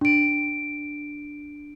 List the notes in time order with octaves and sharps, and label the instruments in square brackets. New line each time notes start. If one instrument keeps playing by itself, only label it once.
[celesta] D4 D7